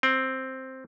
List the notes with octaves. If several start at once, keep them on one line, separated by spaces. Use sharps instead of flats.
C4